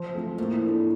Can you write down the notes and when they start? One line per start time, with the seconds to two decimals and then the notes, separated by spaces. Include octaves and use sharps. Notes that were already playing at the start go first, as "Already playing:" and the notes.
Already playing: F3
0.14 A3 C4 F4
0.38 A2 A#3
0.63 D4 A4